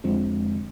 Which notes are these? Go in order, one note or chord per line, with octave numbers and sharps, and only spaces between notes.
F2 D3 F3 G#3 C4
D3